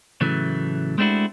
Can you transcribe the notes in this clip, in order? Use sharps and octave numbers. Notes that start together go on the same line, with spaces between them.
A2 C#3 E3 F#3 A3
G#3 A3 C4 D4 E4 F#4